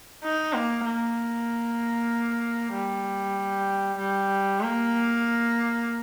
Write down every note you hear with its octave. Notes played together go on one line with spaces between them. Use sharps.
D#4
A#3
A#3
G3
G3
A#3